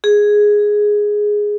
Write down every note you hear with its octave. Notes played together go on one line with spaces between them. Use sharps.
G#4